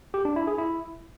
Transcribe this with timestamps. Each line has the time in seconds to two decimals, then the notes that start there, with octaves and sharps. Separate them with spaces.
0.14 G4
0.25 D4
0.36 E4
0.47 G#4
0.58 E4